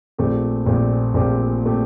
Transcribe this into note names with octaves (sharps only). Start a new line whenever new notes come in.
A#1 A#2 A3 C4 G4
A#1 A#2 A3 C4 G4
A#1 A#2 A3 C4 G4
A#2 A3 C4 G4